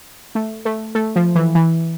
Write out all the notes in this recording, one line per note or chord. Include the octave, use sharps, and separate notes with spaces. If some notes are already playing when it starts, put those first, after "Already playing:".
A3
A3
A3
F3
E3
E3